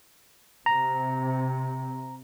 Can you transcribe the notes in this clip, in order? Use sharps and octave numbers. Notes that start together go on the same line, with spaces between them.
C3 A#5